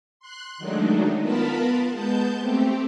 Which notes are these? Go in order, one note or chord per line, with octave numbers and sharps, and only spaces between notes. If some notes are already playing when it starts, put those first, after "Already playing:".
C6 F#6
D#3 F#3 G#3 A3 D4 D#4
B3 F4 A#4 A5 B5
G#3 B3 A5 G6
A3 C4 G4